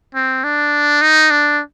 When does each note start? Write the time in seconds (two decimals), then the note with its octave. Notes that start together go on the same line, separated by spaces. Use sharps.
0.15 C4
0.44 D4
1.02 D#4
1.31 D4